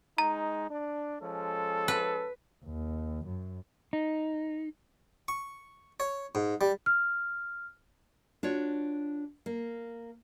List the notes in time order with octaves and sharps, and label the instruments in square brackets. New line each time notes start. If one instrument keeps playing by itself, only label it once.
[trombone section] G#3 D#4 [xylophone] A#5
[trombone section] D4
[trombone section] F3 G#3 C#4 [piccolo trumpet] A4
[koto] B4
[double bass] D#2
F#2
[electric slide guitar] D#4
[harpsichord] C#6
C#5
G#2
G3
[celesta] F6
[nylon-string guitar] D4 F4 F#4 C#5
A#3